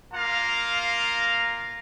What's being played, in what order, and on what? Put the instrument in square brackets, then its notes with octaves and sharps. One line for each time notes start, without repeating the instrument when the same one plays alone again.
[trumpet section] A#3 F4 F5 A#5